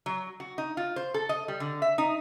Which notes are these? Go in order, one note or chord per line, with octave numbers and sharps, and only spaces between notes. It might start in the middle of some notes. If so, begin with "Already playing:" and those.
F#3
F#4
D#4
F4
C5
A4
D#5
G3
D3
E5
D#4